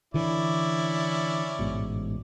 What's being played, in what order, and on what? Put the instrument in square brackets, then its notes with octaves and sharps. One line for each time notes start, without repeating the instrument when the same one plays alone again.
[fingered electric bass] D3 E3 [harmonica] C#4 E4 D5
[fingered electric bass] A1 G#2 B2